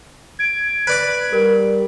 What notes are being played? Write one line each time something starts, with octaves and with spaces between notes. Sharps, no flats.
G#6 D7
B4 D5 D6
G3 A#4